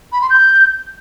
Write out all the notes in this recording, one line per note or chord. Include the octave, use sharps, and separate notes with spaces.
B5
C6
G6